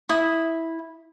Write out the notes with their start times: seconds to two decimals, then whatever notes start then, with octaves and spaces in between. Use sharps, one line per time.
0.09 E4 D#6